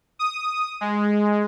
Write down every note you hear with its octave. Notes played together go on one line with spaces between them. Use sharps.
D#6
G#3